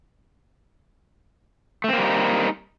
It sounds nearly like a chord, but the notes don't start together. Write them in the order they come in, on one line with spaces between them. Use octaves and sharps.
A3 C4 A#3 G3 D#4